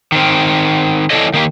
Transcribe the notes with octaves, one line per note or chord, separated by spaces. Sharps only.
D#3 C4
E3 B3 D4 A4 C#5 D#5
D#3 A#3 G4